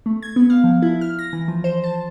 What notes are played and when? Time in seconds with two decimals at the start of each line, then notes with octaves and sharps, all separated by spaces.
0.06 A3
0.22 G#6
0.36 B3
0.50 F5
0.64 F3
0.82 E4
1.01 F6
1.19 A#6
1.33 E3
1.48 F3
1.64 C5
1.84 A5